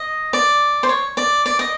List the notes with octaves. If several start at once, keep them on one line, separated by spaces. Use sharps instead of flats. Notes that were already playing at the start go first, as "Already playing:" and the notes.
Already playing: D#5
D5
C5
C#5
D5
D5
D#5